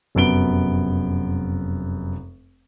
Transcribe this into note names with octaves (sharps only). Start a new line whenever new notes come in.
F1 F#2 B3 D7 G7